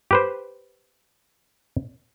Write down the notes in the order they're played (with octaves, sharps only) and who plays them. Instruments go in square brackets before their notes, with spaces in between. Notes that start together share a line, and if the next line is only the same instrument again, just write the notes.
[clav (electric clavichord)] G4 B4 C5